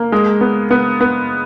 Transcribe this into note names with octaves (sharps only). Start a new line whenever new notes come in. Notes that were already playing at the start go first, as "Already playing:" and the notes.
Already playing: A#3
G#3
B3
B3
B3